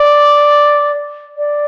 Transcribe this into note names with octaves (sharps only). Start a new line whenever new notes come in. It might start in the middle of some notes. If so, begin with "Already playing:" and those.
Already playing: D5
D5